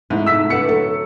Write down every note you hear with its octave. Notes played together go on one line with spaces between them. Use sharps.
G#2 A3 E4
E6 B6
D3 B4 F#5 C#7
F#3 A4